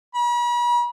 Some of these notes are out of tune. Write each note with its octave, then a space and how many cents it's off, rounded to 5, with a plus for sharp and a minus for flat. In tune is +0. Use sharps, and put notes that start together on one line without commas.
B5 -45